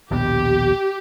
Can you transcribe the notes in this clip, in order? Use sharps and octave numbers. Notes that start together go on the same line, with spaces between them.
A#1 D#2 B2 G4